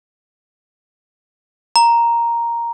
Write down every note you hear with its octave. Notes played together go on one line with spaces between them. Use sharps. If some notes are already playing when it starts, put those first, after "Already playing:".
A#5